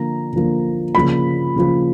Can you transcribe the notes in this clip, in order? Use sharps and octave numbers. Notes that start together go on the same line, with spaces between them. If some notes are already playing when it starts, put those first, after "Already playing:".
Already playing: D3 F3 A#3 A#5
D3 F3 A#3
C#3 F3 A#3 B5
C#3 F3 A#3